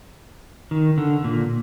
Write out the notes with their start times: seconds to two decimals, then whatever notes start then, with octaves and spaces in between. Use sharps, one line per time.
0.71 D#3
0.98 D3
1.24 A#2